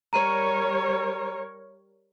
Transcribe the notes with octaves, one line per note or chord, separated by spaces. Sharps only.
G3 A#4 C#5 A#5 D#7